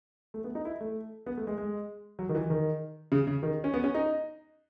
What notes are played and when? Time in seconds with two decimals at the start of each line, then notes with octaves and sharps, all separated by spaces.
0.34 A3
0.44 B3
0.55 D#4
0.65 E4
0.81 A3
1.26 B3
1.37 A3
1.47 G#3
1.58 G#3
2.19 F#3
2.29 D#3
2.35 E3
2.50 D#3
3.12 C#3
3.27 C#3
3.43 D#3
3.64 C#4
3.74 B3
3.84 C#4
3.94 D#4